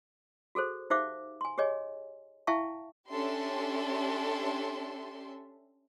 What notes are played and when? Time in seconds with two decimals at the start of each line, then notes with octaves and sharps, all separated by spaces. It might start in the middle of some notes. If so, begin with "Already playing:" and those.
0.55 F#4 G#4 A4 C5
0.90 D#4 G4 C5 E5 F5 D6
1.41 G#5 C6
1.58 G4 G#4 C#5 D#5 G#5
2.47 E4 E5 F5 G5 A5 C#6
3.09 C#4 D4 G4 A4 E5 C6